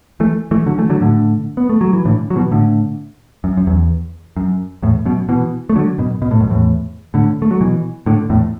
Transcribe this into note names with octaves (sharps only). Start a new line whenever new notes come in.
E3 A3
E3 A3
D3 F#3
E3 A3
D3 F#3
A2 D3
B3
A3
F#3
E3
A2 D3
F#3
B2 E3
A2 D3
F#2
F#2
E2
F#2
E2 A2
F#2 B2
B2 E3
A3
D3 F#3
F#2 B2
B2
A2
F#2
E2 A2
A2 D3
A3
F#3
B2 E3
A2 D3
E2 A2